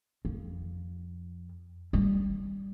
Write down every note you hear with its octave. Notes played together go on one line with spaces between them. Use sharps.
F2
G3